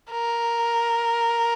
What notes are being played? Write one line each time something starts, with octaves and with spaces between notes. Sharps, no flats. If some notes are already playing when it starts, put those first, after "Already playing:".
A#4